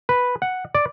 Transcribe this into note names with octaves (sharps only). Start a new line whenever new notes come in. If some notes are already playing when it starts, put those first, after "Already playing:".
B4
F#5
D5